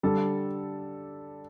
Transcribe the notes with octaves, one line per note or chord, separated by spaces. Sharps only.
D3 G3 A4